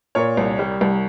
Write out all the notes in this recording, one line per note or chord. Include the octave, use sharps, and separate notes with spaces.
A#2 A#4 C#5
C2
G3
C2